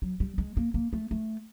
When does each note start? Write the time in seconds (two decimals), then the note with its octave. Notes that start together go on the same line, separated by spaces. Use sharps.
0.02 F#3
0.20 G3
0.38 G#3
0.57 A#3
0.74 A#3
0.93 A3
1.11 A3